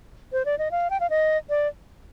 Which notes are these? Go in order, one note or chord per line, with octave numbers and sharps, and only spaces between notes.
C5
D5
D#5
F5
G5
F5
D#5
D5